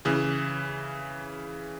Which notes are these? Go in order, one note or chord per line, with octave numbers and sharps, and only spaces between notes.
C#3 E3